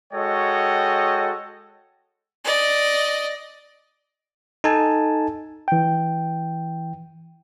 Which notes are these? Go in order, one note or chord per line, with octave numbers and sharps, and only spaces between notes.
G#3 F#4 A4 C#5 D#5 G5
D5 D#5
D#4 A4 G#5 A5
E3 G5